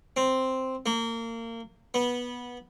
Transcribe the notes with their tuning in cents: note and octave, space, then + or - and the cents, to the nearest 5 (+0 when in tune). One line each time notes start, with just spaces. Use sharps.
C4 +0
A#3 -25
B3 -15